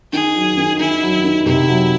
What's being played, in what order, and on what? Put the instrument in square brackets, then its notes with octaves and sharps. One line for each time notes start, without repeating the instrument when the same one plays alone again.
[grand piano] D#3 [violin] G#4
[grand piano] F#3
D#3
[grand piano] D#3 [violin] E4
[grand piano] F#3
D#3
[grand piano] C3 [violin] E4
[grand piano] F#3